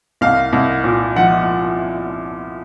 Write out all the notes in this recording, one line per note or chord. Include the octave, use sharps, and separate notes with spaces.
C2 F5
C2
A#2
F3 F#5